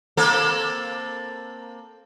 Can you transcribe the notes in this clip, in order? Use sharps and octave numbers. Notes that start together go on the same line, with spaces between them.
A#3 C4 A4